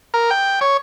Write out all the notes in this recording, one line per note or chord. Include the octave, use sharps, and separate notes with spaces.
A#4
G5
C#5